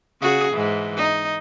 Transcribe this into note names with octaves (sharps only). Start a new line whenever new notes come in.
C#3 F#4 G#4
G#2 E3
D#4